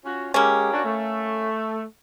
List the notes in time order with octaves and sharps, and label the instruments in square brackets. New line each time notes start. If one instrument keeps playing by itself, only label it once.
[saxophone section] C#4 F4 F#4
[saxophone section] G#3 G4 [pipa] A#3 C#4
[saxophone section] D4 F#4
A3